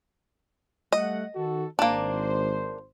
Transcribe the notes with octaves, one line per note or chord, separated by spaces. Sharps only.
G3 A3 D#5 F#5
D#3 F#4 A4
G#1 A#3 D4 C5